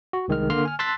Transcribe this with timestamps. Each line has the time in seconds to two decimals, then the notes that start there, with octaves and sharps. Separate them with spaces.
0.13 F#4
0.28 C2 D#3 G#3 F6
0.50 D3 A#3 C6 F6
0.65 G#5 F6
0.79 A5 C6 E6 F#6 A6 B6